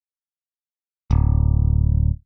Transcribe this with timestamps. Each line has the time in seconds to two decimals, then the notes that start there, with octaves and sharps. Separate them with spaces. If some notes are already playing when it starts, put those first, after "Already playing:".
1.11 D1